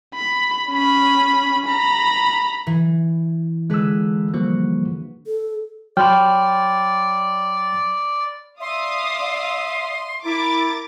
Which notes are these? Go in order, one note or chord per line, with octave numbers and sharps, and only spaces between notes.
B5
C#4 B5
A#5 B5
E3
D3 G#3 G#4 B4 E6
F3 G3 A#3 F#4
A4
F#3 C#5 D5 G5 B5 C6 F6
D5 E5 F5 C6 D#6
E4 A#4 D6 A6